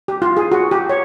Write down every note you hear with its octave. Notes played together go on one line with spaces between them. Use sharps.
G4
F4
G#4
F#4
G4
C#5